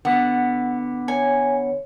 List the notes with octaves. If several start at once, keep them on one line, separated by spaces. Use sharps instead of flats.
D3 B3 F#5
C#5 G#5